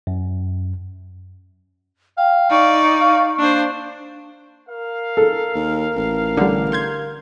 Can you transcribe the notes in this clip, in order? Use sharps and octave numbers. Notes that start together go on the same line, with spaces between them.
F#2
F5 G5
D#4 D5 C#6
F5
A#3 D4 C5
A#4 F5
A4
D#2
A1
D3 G3
C6 G6 G#6